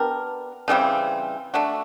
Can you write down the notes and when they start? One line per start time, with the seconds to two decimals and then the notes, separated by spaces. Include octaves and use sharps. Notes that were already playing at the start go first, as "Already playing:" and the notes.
Already playing: B3 D4 G4 A#4
0.68 C#3 E3 G3 C4
1.54 A3 D4 F#4